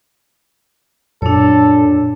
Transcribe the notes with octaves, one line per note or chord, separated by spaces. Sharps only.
F#2 A#2 D4 A4 C#5